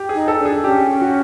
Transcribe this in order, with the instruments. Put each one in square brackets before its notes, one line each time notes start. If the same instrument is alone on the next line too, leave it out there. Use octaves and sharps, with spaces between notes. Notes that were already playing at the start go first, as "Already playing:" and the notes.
Already playing: [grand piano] G4
G#4
[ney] D#4
[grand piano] A4
[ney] D4
[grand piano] G#4
[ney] C#4 [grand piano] G4
[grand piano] F#4